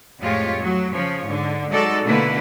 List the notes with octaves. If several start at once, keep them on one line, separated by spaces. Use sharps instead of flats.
F2 A2 G#3 F4 G4 C#5
A2 F#3
C#3 F3 C#5
G#2 D3
F#3 G#3 D#4 F#4 A4 D5
B2 D3 A3 A#3 E4 B4